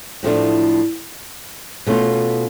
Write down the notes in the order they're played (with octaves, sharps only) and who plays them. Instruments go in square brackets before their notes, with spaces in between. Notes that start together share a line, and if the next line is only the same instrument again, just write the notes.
[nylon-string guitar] A2 F3 A3 D4
B2 A3 C#4 F4